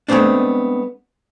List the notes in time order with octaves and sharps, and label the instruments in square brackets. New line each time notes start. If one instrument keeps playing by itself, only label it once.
[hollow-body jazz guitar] G#3 A3 B3 C4 D4